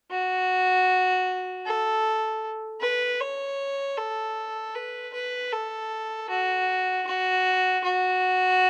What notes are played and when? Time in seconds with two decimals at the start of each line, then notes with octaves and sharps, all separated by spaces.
0.11 F#4
1.66 A4
2.81 B4
3.21 C#5
3.97 A4
4.74 B4
5.14 B4
5.52 A4
6.29 F#4
7.07 F#4
7.84 F#4